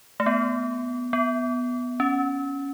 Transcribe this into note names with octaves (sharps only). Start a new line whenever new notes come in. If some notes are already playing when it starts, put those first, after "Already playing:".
A3
B3
B3
C#4